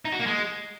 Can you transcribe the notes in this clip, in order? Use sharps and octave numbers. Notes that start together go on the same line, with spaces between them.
D#4
F#4
A#3
G#3